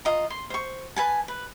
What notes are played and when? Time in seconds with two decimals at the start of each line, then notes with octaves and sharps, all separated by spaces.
0.05 F4 D#5 A#5
0.30 C6
0.50 C5 C#6
0.96 B4 G#5 A5
1.28 B4